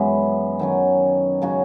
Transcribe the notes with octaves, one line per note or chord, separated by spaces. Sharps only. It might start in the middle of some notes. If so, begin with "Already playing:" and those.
Already playing: F#2 E3 G#3 B3
D#3 F#3 C#4
C#3 F#3 C#4 F#4